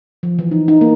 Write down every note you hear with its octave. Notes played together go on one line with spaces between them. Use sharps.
F3
E3
D#4
D#4
A#3